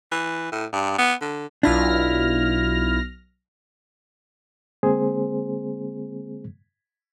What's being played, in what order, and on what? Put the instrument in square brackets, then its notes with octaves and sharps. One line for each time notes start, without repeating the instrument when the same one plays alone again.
[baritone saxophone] E3
A2
G2
B3
D3
[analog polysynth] B1 F6 A#6 [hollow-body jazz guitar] D4 E4 F4
[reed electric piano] D3 G#3 A#3 C4 G#4 C5